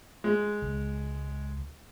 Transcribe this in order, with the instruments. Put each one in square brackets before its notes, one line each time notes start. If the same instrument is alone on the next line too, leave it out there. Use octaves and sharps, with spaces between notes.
[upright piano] G#3
[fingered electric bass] C#2